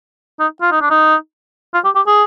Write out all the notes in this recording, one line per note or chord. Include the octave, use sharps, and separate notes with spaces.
D#4
F4
D#4
D4
D#4
F4
G4
G4
G#4